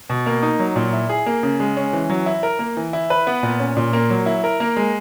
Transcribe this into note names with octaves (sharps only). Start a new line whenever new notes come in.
B2
A#3
D#4
F#3
A#2
E4
G#4
A#3
C#3
G#3
C#4
E3
F#3
E4
A#4
A#3
E3
E4
B4
B3
A#2
C#4
A#2
A#3
F#3
E4
A#4
A#3
G#3